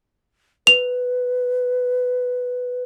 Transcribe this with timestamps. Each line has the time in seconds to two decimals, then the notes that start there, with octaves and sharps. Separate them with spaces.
0.67 B4 F7